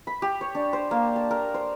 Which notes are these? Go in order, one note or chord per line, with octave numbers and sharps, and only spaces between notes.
B5
G4
C#5
D4
C5
A#3
A5
A#4
C5